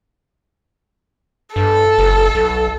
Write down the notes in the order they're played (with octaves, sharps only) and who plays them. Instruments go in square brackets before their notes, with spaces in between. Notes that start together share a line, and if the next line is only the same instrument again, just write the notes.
[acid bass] G2 [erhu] A4
[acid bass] F#1
B1